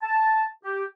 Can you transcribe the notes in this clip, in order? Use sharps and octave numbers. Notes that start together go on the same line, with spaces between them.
A5
G4